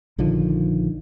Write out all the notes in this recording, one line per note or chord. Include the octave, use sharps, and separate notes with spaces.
A#1 D3 D#3 F3